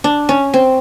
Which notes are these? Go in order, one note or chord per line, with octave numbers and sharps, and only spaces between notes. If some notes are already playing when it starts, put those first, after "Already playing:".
D4
C#4
C4